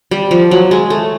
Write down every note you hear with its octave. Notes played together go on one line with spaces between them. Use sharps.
G3
F3
F#3
G#3
A3